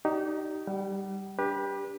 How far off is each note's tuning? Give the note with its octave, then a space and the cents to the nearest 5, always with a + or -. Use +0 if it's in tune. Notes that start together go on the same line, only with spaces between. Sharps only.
D#4 +0 G4 -35 D5 +0
G3 +0 F#5 +45
D4 -15 G4 +15 B4 -30